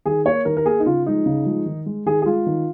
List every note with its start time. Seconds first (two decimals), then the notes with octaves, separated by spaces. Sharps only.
0.06 D#3 G#4
0.25 A#3 C#5
0.45 D#3 A#4
0.57 A#4
0.65 A#3 G#4
0.80 D#4
0.86 C#3 F4
1.06 F3 G#3 D#4
1.26 C#3
1.45 F3 G#3
1.66 D#3
1.86 G#3
2.06 D#3 G#4
2.22 G#4
2.26 G#3 F4
2.46 D#3